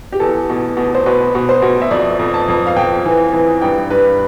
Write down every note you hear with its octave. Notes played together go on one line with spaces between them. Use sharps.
G4
E2 A4
B2
B2
C5
B2 B4
B2
C5
B2
E5
F2 D5
F2
A5
F2
F5
F2 G5
E3
E3
G2 G5
G2 B4